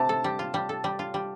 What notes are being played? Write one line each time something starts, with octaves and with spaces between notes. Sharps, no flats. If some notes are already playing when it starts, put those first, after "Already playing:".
Already playing: C3 A3 A5
A4
G3
F4
G3
A4
G3
F4
G3